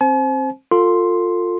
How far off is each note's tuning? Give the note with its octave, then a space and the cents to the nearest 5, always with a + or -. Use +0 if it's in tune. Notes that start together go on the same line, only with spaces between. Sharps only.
C4 +25 C5 +0 G#5 +45
F4 +20 A4 +30 C6 +0